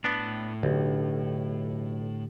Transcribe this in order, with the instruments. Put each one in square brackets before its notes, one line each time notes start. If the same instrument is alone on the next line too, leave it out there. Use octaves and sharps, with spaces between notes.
[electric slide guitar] A2 A5 [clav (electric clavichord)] B3 D4
[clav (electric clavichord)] B1 [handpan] D3 G4